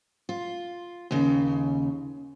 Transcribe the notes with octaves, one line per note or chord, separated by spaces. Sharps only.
F4
D#2 C#3